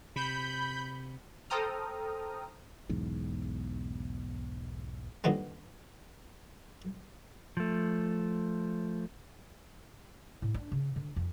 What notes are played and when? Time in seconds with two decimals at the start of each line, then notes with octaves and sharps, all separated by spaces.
0.16 C3 B5 G6
1.50 A4 C5 G5 A#5 D#6 F6
2.89 B1 E2 G#2
5.24 G2 A#2 D3 D#3 B3 C4
7.57 F3 A3
10.42 A2
10.54 D4
10.72 C#3
10.96 D3
11.16 F2